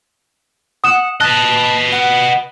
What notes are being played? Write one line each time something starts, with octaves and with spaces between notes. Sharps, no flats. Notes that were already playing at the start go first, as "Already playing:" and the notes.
F#5 D#6 E7
B4 D#5 A5 F#6
F#5